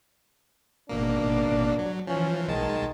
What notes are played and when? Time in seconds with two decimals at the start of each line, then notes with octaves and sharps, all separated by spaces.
0.89 G#1 B2 A#3 D4
1.79 F#3
2.07 E3 F3 C#4
2.48 B1 D#3 G#3 A5